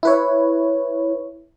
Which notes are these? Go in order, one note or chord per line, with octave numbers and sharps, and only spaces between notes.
E4 B4 C#5